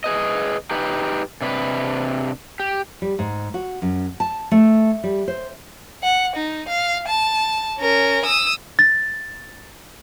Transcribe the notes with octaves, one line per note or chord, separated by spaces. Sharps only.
G#4 B4 D#5
D#4 G4 B4
C3 D4 B4
G4
G3
G#2
F#4
F#2
A5
A3
G3
C5
F#5
D#4
F5
A5
C#4 A#4
D#6 E6
A6